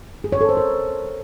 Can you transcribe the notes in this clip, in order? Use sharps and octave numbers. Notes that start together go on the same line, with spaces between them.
G#4
C#5
A4
C5
A#4